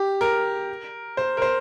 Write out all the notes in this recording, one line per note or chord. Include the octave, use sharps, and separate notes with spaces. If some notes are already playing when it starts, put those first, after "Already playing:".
Already playing: G4
A#4
C5
A#4
C5